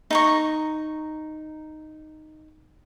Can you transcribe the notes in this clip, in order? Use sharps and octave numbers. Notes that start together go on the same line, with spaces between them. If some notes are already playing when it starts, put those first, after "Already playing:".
D#4 A#5 C#6